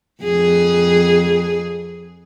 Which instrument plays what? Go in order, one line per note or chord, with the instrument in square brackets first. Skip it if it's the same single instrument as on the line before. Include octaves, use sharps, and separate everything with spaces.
[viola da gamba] F2 G#4